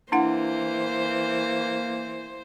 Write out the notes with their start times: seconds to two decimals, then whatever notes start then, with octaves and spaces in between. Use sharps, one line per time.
0.12 E3 A#3 D4 E4 C5 F#5